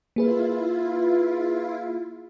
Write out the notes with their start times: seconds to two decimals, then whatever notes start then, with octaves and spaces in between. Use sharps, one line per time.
0.16 A#3 E4 F4 G#4 B4